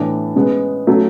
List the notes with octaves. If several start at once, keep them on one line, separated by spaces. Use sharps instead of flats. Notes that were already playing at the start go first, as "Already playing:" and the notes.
Already playing: A2 E3 B3 D4
C#3 G#3 B3
C#3 F#3 A3